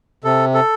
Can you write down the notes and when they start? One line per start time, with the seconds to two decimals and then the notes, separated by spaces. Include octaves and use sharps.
0.24 C3 A4
0.54 A4